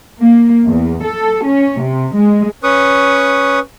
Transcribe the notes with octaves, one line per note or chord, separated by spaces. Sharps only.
A#3
E2
A4
C#4
C3
G#3
C#4 B4 C#6 D#6